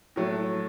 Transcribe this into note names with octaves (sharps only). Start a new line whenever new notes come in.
A2 F#3 A3